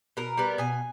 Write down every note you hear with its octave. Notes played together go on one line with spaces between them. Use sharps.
B2 A#4
G3 B3
B2 G#5